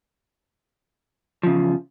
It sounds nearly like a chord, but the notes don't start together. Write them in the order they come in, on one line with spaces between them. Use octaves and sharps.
F3 C#3 E2